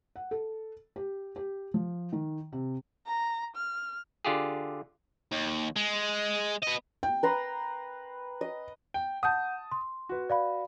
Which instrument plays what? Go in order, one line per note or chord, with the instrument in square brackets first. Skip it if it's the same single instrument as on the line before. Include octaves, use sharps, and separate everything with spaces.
[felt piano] F#5
A4
G4
G4
F3
D#3
C3
[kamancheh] A#5
F6
[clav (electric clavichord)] D3 F4 G4 G#4
[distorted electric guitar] D#2
G#3
B3 D#5
[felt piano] G5
[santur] B4 A#5 C6
D#5
[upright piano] G5
[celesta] F#5 G6 [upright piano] A5 D#6
[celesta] C6
[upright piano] F#4 B4
[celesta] D5 F5 B5